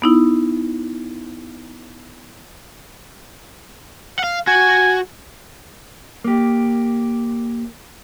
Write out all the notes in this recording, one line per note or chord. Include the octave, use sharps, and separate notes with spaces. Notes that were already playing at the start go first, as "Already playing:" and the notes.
B3 D#4 E4
F5 F#5
F#4 G#5
A#3 G4